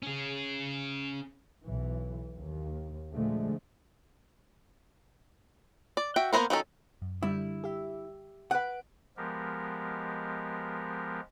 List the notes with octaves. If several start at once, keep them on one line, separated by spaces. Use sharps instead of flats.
C#4 G#4
B1 E3
D#2
A#2 D3 F3 G#3 A3
D5
F#4 E5 G5
A#3 B3 E4 A#4 C5
D#3 F#3 C#4 A4
F#2
D3 G3 E4
G4 E5
B4 F#5 F#6 D7
F3 G#3 B3 G4 A#4